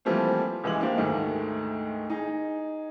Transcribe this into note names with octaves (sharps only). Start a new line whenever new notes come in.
E3 F3 G3 A3 A#3 C4
C#2 E3 G#3 F#7
A#3 B3 D4 G4 C5
D2 G#2 D#3 A3
D#4 G#4